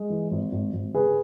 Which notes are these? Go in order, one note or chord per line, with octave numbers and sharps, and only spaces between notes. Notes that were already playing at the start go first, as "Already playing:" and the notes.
Already playing: G#3
E3
G#1
G#1
G#1
C#3 G#4 B4